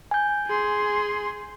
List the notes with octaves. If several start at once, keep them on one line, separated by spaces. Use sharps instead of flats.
G#5 G6
G#4 C6